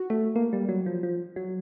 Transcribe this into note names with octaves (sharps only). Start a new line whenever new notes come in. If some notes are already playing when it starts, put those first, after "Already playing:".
Already playing: F#4
A3
A#3
G3
F#3
F3
F3
F#3